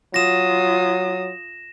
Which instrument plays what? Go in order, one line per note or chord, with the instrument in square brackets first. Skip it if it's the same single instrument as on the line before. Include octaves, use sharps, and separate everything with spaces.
[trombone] F#3 [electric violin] F4 D#6 [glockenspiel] A#6 E7